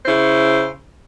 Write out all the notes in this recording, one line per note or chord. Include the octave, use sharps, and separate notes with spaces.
C#3 C#4 E4 C5